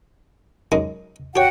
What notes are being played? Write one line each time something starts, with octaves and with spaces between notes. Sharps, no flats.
F#2 G#3 D#4
F#4 G4 C#5 F#5 G5